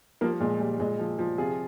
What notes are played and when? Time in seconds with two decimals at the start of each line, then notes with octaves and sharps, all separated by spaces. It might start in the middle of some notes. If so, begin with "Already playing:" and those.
0.21 F3 G3 A#3
0.40 A#2 G#3
0.60 A#2 G3
0.79 A#2 G#3
0.99 F3
1.19 F3
1.38 C3 F4 G#4